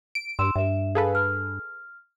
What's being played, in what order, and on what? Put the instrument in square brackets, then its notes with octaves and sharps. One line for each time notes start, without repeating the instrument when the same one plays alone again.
[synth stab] D7
[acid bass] G2 [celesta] C6 E6 E7
[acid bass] G2 [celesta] E5 E7
[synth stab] G#4 A4 B4 [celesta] F5
[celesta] F6